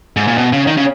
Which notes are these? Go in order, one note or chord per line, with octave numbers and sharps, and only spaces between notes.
G#2
A#2
B2
C#3
D#3
C#3